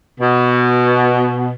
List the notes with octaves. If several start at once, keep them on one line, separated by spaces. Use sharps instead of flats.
B2